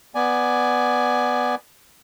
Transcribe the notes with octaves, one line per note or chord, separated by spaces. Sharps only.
B3 D5 G#5